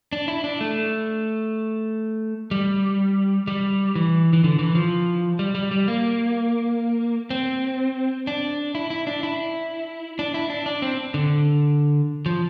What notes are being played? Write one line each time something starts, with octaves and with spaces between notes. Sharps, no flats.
D4
E4
D4
A3
G3
G3
E3
E3
D3
E3
F3
G3
G3
G3
A#3
C4
D4
E4
E4
D4
E4
D4
E4
D4
D4
C4
D3
F3